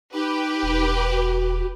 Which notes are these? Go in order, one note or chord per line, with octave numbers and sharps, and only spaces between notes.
D#4 G4 B4
E1
F#4